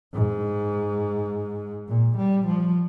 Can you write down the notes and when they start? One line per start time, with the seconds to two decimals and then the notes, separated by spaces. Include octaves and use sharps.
0.14 G#2
1.88 A#2
2.17 G3
2.46 F3